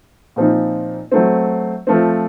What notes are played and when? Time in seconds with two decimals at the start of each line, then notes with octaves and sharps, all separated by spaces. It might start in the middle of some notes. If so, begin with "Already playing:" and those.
0.36 A#2 F3 C4 D#4
1.12 F#3 A3 C4
1.87 F3 A3 C4